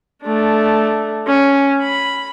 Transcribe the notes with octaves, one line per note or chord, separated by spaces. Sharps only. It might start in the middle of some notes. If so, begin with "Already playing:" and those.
A3 D4
C#4
B5